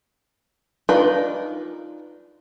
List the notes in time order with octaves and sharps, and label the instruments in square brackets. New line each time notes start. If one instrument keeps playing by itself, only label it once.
[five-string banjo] D4 D#4 F4 A#4 B4